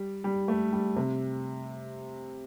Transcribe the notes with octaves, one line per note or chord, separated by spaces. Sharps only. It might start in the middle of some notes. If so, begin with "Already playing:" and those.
Already playing: G3
G3
A3
G3
C3